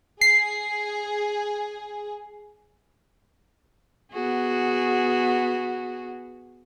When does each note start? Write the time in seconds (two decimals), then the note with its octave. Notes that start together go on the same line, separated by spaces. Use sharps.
0.21 G#4 C7
4.13 B3 F#4 G#4